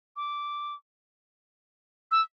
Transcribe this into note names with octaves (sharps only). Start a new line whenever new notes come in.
D6
E6